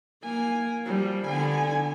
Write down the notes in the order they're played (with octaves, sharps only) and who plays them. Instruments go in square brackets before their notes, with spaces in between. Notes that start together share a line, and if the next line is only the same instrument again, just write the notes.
[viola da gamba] A#3 [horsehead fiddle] G#5
[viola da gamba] F3 [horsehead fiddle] G3
[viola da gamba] D3 B3 [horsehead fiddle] G#5